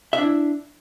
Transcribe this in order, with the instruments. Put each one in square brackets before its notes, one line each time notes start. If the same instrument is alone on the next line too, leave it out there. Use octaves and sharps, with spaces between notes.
[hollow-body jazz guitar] E5
D4
E4